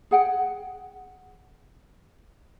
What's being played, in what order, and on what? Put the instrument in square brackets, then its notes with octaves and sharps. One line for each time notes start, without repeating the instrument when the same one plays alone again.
[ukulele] G#4 F#5 G5